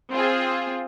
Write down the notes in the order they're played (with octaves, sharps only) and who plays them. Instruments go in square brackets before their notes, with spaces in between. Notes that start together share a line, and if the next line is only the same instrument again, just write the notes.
[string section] C4 F4 G#4